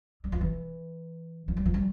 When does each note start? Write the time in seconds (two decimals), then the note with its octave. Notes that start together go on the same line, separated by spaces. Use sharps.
0.24 G3
0.32 F3
0.41 E3
1.48 F3
1.57 G3
1.65 F3
1.74 G3